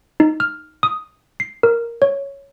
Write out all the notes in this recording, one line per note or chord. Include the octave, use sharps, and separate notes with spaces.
D#4
F6
D#6
C7
A#4
C#5